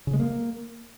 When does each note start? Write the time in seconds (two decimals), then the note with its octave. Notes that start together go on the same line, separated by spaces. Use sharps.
0.07 C#3
0.13 G#3
0.20 A#3